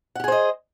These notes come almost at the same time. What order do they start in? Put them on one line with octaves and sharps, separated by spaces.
F#5 G4 G#4 C5 D#5